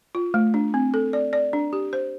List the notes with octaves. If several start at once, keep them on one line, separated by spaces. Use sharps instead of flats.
F4
A3
D4
C4
A4
D5
D5
D4
G4
C5